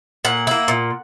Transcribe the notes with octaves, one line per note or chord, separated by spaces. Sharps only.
A#2 F#5
A#3 E4
A#2